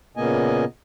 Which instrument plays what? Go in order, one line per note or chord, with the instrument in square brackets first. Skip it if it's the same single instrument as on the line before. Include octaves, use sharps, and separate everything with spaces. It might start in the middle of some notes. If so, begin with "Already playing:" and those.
[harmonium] A#2 C#3 A#3 B3 D#5 G#5